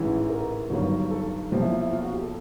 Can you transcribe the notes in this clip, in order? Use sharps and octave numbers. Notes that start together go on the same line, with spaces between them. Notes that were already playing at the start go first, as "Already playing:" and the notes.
Already playing: A1 G#2 E3
A#4
G1 G2 D#3 F#3
A4
B1 A#2 F3 G4
E4
F4
E4
F4
F#4
G4
A4